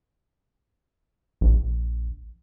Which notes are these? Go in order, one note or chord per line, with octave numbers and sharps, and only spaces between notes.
A#1